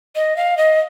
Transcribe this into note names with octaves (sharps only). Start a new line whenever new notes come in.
D#5
F5
D#5